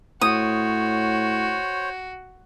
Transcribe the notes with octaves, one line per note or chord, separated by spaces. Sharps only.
A2 F#4 C5 C#5 D#6